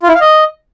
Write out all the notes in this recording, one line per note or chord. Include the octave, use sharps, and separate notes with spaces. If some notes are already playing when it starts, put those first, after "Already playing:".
F4
E4
F5
D#5